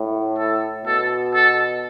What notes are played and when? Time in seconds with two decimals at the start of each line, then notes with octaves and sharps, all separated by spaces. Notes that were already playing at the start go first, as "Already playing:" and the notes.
Already playing: A2
0.38 A4
0.85 B2 A4
1.34 A4